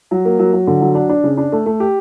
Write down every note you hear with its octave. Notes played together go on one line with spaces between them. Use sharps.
F#3
A#3
F#3
F#3
D3
F#3
D4
D4
C#3
D4
A3
A3
G4